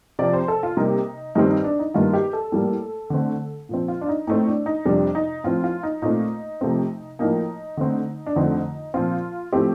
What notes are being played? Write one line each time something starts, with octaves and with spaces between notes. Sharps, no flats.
C3 F3 C4 D5
C5
A4
F4
C3 G3 A#3 D#4
G2 D#3 G3 C4 D#4
D#4
D4
D#4
G2 D#3 A#3 F4
G4
A4
A2 G3 A#3
D3 A3 C4
A#2 F3 C4
F4
D4
D#4
A2 A3 C4 D#4
D4
D#4
F2 C3 G3 D4
D#4
A2 F3 C4 F4
F4
D#4
A#2 A3 C4 D#4
C3 F3 A3 C4
A2 F3 A#3 D#4
D3 A3 C4
D4
F2 D3 A3 C4 D#4
A#2 F3 C4 F4
A2 F3 A3 C4 G4